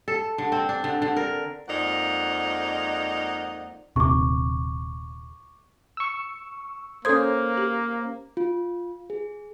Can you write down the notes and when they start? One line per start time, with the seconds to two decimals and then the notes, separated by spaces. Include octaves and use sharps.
0.08 A4
0.38 D3
0.52 C4
0.69 D4
0.84 D3
1.02 D3
1.17 A#4
1.69 F2 G#3 A#3 D#4 D5 F#5
3.96 D#1 C3 C#6 D6
5.97 C#6 E6
7.05 A#3 C#4 A4 C5 D#6 G#6
7.58 G4
8.37 F4
9.10 G#4